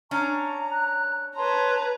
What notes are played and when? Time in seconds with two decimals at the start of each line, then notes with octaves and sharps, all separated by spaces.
0.11 C#4 D4 A#5 C#6
0.72 F#6
1.36 B4 C#5 A5 A#5 C6